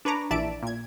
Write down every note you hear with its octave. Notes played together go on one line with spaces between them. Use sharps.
D4 B4 C#5 A#5 D6
A#1 E3 D5 E5 A5 D7
A#2 G#6